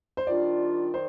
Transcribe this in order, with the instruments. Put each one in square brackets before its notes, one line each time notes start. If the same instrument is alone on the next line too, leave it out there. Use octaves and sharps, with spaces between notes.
[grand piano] C5
[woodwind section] D#3 G3 D4 F4 [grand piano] D5
[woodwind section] D#3 [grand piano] C5